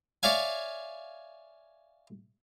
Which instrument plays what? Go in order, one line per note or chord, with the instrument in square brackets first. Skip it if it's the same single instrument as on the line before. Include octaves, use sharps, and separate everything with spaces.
[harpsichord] C#5 D5 E5 F5 G#5